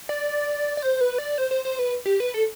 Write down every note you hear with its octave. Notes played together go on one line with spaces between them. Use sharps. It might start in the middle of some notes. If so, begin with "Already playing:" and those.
D5
D5
C5
B4
D5
C5
C5
C5
B4
G4
B4
A4